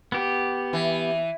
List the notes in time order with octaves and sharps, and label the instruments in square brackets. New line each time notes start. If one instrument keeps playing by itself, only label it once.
[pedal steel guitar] B3 G4
[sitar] E3